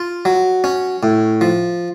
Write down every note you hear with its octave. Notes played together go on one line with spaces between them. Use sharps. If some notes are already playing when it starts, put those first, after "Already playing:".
Already playing: F4
F#3
C#4
A2
F3